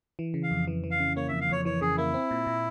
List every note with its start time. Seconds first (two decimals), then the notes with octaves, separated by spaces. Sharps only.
0.19 E3
0.34 C#3
0.43 F5
0.51 F2
0.67 E3
0.84 E3
0.91 F5
0.99 C#3
1.16 A#3 C#5
1.28 F2 E5
1.41 F5
1.49 F2 C#5
1.65 E3 C#5
1.81 C#3 G#4
1.97 A#3 E4
2.14 C4
2.31 A#2
2.47 A#2